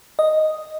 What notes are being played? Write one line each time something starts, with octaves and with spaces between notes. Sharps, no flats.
D#5